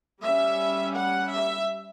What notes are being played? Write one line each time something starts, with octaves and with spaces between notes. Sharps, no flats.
G3 C#4 E5
F#5
E5